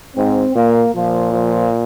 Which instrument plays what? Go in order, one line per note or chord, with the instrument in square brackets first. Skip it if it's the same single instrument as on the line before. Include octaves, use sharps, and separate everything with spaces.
[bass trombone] G#2 [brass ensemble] C4
[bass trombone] A#2 [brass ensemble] A#3
[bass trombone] A#2 [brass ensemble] F3
[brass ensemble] F3